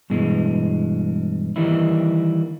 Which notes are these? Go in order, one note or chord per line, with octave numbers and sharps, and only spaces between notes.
G2 B2 E3 G#3
D#3 E3 G3 A#3 D#4 E4